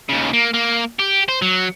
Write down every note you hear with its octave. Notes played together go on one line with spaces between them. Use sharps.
D#2 C#3
A#3
A#3
G4
C5
F#3